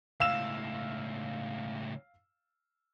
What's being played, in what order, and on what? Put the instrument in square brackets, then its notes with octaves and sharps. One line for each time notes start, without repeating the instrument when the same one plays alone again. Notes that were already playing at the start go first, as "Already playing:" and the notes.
[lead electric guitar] C#2 A2 [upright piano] F5 E6 E7